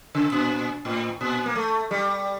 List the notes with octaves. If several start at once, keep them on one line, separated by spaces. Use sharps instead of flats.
C#3
A#2
A2
A#2
A#3
A3
G3